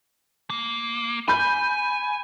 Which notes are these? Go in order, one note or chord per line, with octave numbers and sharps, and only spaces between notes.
A#3
G#5 B5 G6